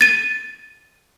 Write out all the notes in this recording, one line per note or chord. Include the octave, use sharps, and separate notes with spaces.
A6 D#7